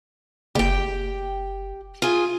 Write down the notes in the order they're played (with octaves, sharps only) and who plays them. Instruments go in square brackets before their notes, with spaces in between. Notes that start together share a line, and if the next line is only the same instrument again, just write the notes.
[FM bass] F#1 [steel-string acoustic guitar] G4 G5
[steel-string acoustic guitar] F4 G#4